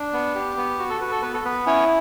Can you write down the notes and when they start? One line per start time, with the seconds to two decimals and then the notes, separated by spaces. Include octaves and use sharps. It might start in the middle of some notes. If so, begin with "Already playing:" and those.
Already playing: D4
0.13 B3
0.35 G4
0.57 B3
0.79 F#4
0.90 A4
1.01 F#4 B4
1.11 A4
1.22 B3 B4
1.34 A4
1.45 B3 B4
1.66 C#4 E4 C#5